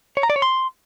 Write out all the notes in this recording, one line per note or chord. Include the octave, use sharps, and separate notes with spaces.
C#5
A#5
D5
C#5
C6